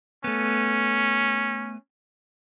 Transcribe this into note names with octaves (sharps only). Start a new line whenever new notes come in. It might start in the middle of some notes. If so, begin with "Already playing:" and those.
A3 B3 C#4